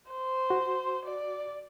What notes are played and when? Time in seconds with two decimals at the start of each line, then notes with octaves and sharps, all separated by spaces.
0.11 C5
0.50 F#4
1.05 D5